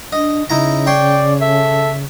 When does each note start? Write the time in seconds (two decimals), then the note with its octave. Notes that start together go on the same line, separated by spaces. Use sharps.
0.13 D4 D#5
0.50 C#3 D#4 E4 A#5
0.87 C#5 D5 G5 C6
1.41 A4 E5